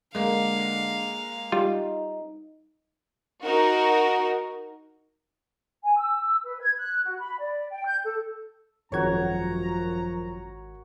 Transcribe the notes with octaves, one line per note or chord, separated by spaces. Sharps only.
D3 G#3 A#3 F5
G3 D#4 F4
D#4 F#4 A#4
G#5
E6
B4
G#6
F#6
F#4
B5
D5
G5
G6
A4
G#1 F#2 F3 F#4 A#4 C#5 A#5 G#6